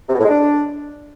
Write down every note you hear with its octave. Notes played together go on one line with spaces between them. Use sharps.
C3
B2
A2
G#3
D4